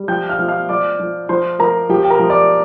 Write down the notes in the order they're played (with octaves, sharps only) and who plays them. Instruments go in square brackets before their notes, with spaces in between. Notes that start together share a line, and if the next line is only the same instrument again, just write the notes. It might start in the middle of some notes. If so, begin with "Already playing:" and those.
Already playing: [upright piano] G3
F3 G5 G6
F5 F6
F3
F5 F6
F3 D5 D6
F3
F3 C5 C6
F3 A#4 A#5
F3 G4 G5
G5
A#4 A#5
F3
D5 D6